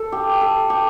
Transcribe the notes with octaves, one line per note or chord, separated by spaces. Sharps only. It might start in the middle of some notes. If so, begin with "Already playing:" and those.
Already playing: A4
G4
A4
G4